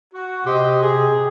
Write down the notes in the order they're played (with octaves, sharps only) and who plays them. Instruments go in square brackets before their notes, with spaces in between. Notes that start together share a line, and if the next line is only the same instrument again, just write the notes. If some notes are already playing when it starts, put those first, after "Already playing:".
[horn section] F#4
[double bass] C3 [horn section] G4 C5 D#5
[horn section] G#4